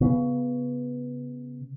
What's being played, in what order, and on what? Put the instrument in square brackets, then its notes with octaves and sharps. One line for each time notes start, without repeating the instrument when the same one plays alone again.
[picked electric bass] C#3 B3